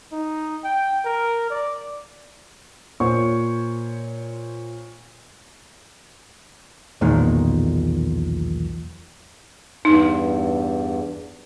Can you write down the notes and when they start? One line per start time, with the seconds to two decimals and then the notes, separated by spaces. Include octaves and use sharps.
0.12 D#4
0.64 G5
1.05 A#4
1.50 D5
3.00 A#2 C5 C#5 C#6
7.01 B1 E2 A#2 D#3 G#3
9.85 E2 G2 D#4